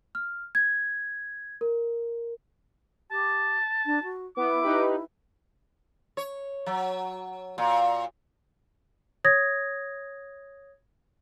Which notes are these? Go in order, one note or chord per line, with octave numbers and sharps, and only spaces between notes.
F6
G#6
A#4
G4 A5
D4
F#4
B3 E4 D6
D#4 G4 B4
C#5
F#3
A#2
C#5 D#6 G#6 A#6